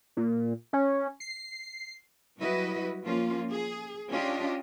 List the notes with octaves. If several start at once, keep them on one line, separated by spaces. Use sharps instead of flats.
A#2
C#4
C7
F#3 G3 E4 F#4 B4 D#5
F3 A#3 C#4 F4
G#4
C#4 D4 F4 G4 D#5